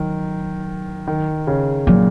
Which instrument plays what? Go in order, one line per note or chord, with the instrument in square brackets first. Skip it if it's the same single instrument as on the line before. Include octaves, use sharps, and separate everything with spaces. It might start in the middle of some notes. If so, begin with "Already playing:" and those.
Already playing: [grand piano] D#3 [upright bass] F#3
[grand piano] D#3
C#3
[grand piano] A#2 [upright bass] F#3